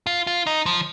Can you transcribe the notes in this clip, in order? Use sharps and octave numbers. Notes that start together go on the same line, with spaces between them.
F4
F4
D#4
F3